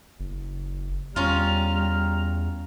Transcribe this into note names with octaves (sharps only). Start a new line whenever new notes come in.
F#1
E2 G3 C#4 F4 A#5 F6